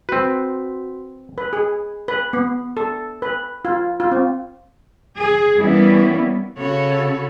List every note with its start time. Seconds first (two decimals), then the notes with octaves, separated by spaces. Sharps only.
0.09 C4 F#4 B4
1.38 B4
1.53 G#4
2.08 B4
2.33 B3
2.77 A4
3.22 B4
3.65 F4
4.00 F4
4.12 C4
5.18 G#4
5.60 E3 G3 A#3 B3 C#4 E4
6.58 C#3 F#4 A4 C#5 B5